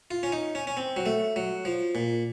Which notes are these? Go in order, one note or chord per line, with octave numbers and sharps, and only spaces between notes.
F4
C#4
D#4
C#4
C#4
C4
F#3
A3
F#3
F3
A#2